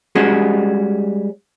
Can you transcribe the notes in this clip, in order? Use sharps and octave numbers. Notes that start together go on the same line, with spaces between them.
G3 G#3 C#4 D#4 F#4 G#4